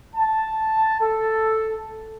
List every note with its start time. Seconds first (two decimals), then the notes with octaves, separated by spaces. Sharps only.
0.15 A5
1.00 A4